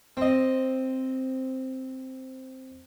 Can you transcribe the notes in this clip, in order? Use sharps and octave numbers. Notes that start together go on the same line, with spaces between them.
C4 D#5